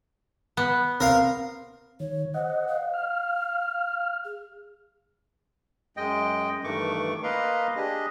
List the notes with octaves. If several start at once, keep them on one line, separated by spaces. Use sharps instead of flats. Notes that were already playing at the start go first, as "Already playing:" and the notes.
B3
C4 A#4 F5
D#3 C#5
C5 D#5 F#5
F5
F6
G#4
F#2 G#3 D#5 G5
G2 D#3 E3 A3 C#6 D6
A#3 B4 D#5 F5 A#5 C6
D4 G4 G#4 D#5